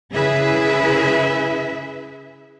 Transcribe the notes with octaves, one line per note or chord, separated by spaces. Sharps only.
C#3 E4 G#4 B4 E5